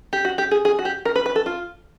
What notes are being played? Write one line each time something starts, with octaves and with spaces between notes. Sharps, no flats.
G4
F#4
G4
G#4
G#4
F#4
G4
A#4
B4
B4
A4
F4